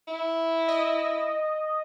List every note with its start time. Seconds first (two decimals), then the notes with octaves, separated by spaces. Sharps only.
0.08 E4
0.68 D#5